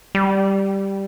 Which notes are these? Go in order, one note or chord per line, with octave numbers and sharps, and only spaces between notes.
G3